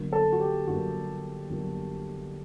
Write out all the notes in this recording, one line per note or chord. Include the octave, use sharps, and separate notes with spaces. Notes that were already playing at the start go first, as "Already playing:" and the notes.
Already playing: G1 G2 F#3 A#3
A4
F#4
G4
G1 G2 F#3 A#3 F#4
G1 G2 F#3 A#3